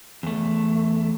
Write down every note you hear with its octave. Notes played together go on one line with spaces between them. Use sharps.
E2 A3